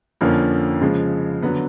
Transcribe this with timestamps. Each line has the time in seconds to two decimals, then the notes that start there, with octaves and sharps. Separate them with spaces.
0.21 F2 D3 F3 A#3 C#4
0.81 C#3 F3 G#3
1.42 D3 F#3 B3